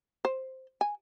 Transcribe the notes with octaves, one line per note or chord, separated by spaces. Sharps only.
C5
G#5